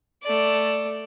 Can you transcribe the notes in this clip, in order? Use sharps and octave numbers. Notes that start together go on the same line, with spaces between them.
A3 D5